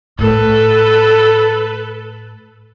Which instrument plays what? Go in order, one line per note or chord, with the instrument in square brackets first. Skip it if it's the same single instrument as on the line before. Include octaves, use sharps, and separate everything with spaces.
[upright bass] A2 A3 [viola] A4 B4